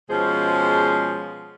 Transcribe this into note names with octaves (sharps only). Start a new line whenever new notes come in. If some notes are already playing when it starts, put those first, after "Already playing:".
B2 F3 G#3 C#4 G#4 C5